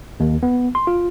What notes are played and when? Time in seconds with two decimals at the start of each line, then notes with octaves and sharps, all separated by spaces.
0.20 D#2
0.43 B3
0.75 C6
0.87 F4